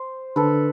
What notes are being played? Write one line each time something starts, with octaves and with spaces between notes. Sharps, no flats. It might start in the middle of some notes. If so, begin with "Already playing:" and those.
Already playing: C5
D3 A4 B4